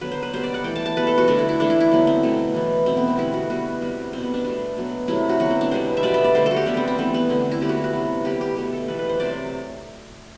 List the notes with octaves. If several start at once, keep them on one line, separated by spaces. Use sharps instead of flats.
D3 F#3 B3 B4
C5
B4
B2 G3 B3 C5
D5
F#5
E3 A3 G5
A5
A5
B2 G3 B3 B4
A4
F#4
D3 A3 D4
E4
E4
E3 A3 D4
E4
E4
D3 F#3 B3
C4
B2 F#3 A3
E3 B3
B2 A3 C4
B3
C4
D3 G3 B3 E4
F#4
B2 G3 B3 F#4
C3 G3 B3
B2 G3 B3 C4
B3
D4
B2 A3 D4
B2 F#3 B3
C3 F#3 A3 E4
F#4
D3 F#3 B3 F#4
C4
D4
B2 G3 B3 C5
E5
B2 G3 B3 D5
E5
D5
D3 A3 C5
F#4 A4
G4
D3 G3 B3 D4
C4
C4
E3 A3 B3
B3
D3 A3 C4
D4
E4
D3 G3 B3 G4
F#4
E4
F#4
C3 F#3 B3
D3 G3 B3 G4
G4
B2 A3 G4
A4
E3 G3 B3 B4
B4
C5
C3 F#3 A3 D5